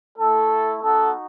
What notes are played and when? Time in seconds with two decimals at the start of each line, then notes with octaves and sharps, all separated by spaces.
0.17 A3 E4 A4
0.81 B3 D#4 F#4 A4